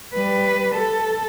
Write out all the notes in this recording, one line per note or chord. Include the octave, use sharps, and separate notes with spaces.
G3 B4
A4